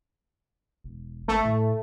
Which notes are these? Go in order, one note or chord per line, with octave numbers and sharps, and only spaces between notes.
E1
G#1 A3
A2